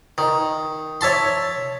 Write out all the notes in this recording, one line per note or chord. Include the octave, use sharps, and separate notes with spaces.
D#3
C#5 E5 A5 C6